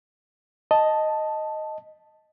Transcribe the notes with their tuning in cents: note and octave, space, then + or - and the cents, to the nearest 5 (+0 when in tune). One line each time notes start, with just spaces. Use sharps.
D#5 +0 A5 +0